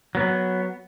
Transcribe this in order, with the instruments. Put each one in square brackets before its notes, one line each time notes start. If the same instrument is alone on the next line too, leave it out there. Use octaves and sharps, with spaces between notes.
[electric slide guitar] F#3 B3